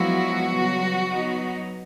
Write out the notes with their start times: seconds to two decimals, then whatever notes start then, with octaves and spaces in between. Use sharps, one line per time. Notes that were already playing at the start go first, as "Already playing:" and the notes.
Already playing: F3 F#3 G#3 B3 E4 F#4
0.47 C#3 E3 G3 B3
1.08 F#3 B3 D#4